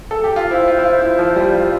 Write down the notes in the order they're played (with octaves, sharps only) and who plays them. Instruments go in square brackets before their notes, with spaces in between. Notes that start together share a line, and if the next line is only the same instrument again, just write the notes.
[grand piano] A4
G4
F4
[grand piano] E4 [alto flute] C5
[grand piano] F4
E4
F4
E4
F3
G3
F4